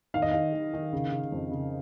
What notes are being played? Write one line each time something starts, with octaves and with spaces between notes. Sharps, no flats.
D#3 F5
D#5
D#3 F5
D#3
D#3
C#3
C#3
F2
C#3